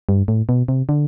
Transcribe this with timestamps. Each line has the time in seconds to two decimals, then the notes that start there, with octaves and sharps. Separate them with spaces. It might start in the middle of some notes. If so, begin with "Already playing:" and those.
0.09 G2
0.28 A2
0.49 B2
0.68 C3
0.89 D3